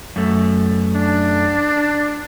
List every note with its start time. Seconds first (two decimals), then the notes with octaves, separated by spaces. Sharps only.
0.16 F#2 A3
0.95 D4